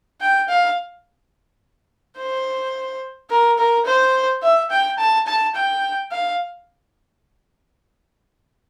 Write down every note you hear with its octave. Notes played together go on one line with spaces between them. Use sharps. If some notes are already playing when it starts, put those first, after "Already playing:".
G5
F5
C5
A#4
A#4
C5
E5
G5
A5
A5
G5
F5